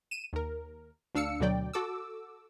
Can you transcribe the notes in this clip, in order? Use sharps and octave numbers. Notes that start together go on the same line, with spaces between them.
D#7 E7
D#2 A#4
D2 D4 F5 E6 C#7
D2 B2 D3 F#3 D5 G5
F#4 A4 D6 E6